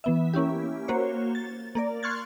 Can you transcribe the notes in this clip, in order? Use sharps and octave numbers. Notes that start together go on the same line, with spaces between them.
E3 B3 E5
A#3 C#4 E4 G4
A#3 F#4 C5 C#5
A6
A#3 A#4 D5
C6 C#6 F6 F#6 G#6 A6